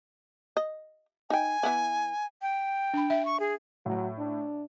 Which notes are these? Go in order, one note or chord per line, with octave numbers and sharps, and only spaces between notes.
D#5
D#4 G5 G#5
E3 B3 E4
G5
D4 B5
E5
C#6
G#4
A2 F#3
D4